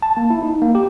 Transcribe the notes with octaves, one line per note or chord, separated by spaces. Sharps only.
A5
A#3
E4
D#4
A#3
G4